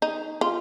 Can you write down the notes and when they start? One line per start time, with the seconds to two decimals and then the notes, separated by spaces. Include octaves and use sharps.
0.02 D#4
0.41 F4